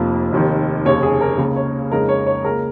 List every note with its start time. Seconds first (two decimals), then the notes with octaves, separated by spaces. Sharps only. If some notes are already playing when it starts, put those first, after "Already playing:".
Already playing: F1 F2 F3 A#3
0.33 F1 D#2 D#3
0.85 F1 D#2 C#3 C#5
1.03 G#4
1.21 A#4
1.38 C#2 C#3 A#3
1.56 C#5
1.91 F2 C#3 G#3 D#4 A#4
2.09 C#5
2.26 C#5
2.44 C#2 C#3 A#3 A#4